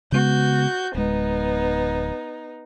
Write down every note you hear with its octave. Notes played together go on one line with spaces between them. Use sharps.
C#3 G#3 B3 F#4 G6
D1 G#3 B3 D#4